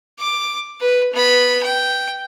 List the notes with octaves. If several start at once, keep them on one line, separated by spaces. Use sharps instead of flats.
D6
B4
B3 B5
G5